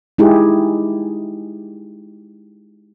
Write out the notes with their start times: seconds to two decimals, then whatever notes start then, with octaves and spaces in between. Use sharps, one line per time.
0.18 G#3 D#4 E4 G4 G#4